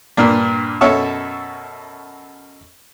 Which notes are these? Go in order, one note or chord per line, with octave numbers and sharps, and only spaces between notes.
G2 A#2 A#3 D4
F#2 B2 A4 C#5 E5 A5